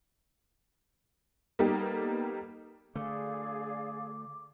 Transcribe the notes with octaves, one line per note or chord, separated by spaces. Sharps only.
G3 A#3 B3 D#4 G4 A4
D3 A3 G#4 D5 F5 D6